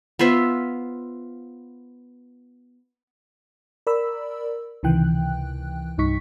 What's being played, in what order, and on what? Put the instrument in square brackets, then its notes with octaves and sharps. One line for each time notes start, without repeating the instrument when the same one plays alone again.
[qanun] B3 F4 C5 E5
[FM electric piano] A#4 D5 B5 E6
C#2 C3 D#3 E3 G5 F#6
C2 G2 D#4 C#6 B6